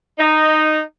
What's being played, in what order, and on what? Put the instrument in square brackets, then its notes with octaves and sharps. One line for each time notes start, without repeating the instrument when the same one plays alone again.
[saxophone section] D#4